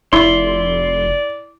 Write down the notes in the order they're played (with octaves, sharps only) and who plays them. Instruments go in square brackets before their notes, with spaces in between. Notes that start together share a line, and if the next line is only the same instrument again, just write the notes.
[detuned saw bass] F1 [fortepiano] E4 [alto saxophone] D5 [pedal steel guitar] C6